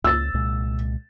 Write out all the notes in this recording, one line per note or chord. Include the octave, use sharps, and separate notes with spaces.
C#2 E6 A6
C2 A#2 G#3